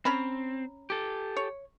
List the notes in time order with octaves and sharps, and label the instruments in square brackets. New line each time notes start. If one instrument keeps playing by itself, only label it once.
[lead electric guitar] C4 [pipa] C#4 A#5 B5
[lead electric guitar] G4 A4
[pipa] C#5